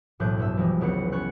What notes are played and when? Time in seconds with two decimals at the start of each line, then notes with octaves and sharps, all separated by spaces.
0.20 E1 B1 A2 F#6 G6
0.38 G2 B3 E5
0.57 E3 F3 G3 G#3
0.80 F1 C#2 B3 C4 F#5 C#7
1.12 B3 C#4 C#5 C#6 F#6 C#7